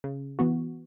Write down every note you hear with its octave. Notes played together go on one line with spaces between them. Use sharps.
C#3
E3 B3 F#4